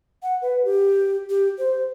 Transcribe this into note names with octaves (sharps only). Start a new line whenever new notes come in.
F#5
B4
G4
G4
C5